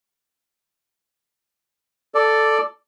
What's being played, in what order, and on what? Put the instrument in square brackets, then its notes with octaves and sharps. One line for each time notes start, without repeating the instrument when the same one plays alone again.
[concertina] A4 D5